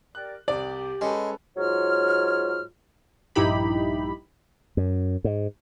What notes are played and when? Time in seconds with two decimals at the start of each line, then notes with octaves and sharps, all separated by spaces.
0.15 G4 A#4 D5 F#6
0.48 C2 G4 D5
1.01 G#3 C#4 A4 B4
1.57 G#2 F#3 F4 C#5 F6
3.35 A#1 G2 D#4 E4 G4 B5
4.77 F#2
5.24 G#2